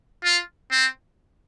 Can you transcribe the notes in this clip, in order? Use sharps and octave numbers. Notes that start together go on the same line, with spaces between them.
F4
C4